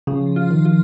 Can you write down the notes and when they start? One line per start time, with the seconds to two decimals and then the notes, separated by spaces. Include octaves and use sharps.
0.07 C#3 F3
0.36 F4
0.51 D#3
0.65 F4